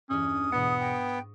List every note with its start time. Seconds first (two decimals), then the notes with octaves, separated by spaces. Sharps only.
0.10 G1 E2 C#4 D4 D#6
0.52 G#2 B2 E3 B3 F#5
0.80 G5 C#6 D#6 A#6